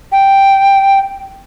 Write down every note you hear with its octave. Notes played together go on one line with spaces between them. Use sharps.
G5